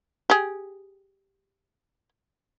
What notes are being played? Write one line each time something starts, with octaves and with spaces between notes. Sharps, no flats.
G4 G#4